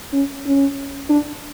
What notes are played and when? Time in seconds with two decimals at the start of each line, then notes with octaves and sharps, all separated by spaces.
0.13 C#4
0.46 C#4
1.09 D4